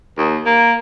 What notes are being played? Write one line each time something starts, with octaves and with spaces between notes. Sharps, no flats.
D#2
A#3